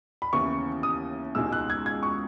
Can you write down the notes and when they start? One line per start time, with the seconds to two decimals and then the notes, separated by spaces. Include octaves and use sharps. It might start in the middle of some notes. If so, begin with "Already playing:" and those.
0.22 B5
0.32 D#2 C#3 E3 B3 E4 C#6
0.83 D#6
1.35 C#2 B2 G#3 D#4 E6
1.53 F#6
1.70 G#6
1.86 G#6
2.03 C#6